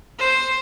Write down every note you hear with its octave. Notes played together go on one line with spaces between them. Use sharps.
C5